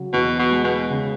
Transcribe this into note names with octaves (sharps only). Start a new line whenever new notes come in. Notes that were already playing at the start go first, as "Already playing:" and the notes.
Already playing: C#3 F#3
E2 B2
B2
G#3
B2
C#3